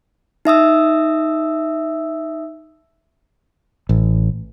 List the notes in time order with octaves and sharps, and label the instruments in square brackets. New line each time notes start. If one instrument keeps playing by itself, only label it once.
[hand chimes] D#4 E5 D#6 E6
[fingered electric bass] A1